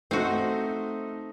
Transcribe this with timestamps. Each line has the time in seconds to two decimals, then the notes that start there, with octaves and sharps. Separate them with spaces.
0.11 A3 C4 D#4 F#4